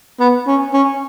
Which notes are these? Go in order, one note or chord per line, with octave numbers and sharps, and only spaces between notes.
B3
C#4
C#4